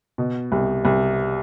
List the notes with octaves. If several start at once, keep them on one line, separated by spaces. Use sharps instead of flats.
B2
C2
C2